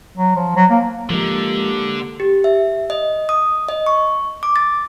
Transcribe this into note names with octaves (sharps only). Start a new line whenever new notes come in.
F#3
F3
F#3
A#3
D3 F3 G#3 A#3 G4
G4
E5
D#5
D#6
D#5
C#6
D6
A6